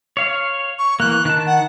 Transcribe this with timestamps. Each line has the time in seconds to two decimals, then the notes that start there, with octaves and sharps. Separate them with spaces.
0.17 C#5 F5
0.79 C#6
1.00 E3 A#3 F#6
1.25 D#3 A5
1.47 F#5